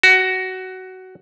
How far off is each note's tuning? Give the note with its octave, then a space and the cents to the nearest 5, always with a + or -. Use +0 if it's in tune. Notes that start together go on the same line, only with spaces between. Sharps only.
F#4 +15